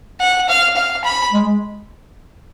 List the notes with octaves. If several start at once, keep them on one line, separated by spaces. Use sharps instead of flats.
F#5
F5
F5
B5
G#3